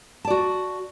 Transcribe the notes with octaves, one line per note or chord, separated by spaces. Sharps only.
F#4 D5 A5